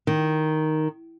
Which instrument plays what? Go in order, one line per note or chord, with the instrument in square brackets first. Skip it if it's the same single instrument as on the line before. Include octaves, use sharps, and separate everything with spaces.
[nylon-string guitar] D#3